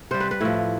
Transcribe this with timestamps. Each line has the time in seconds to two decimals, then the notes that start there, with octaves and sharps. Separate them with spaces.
0.11 C3 G3 C5
0.20 B4
0.31 B4
0.41 A2 F3 E4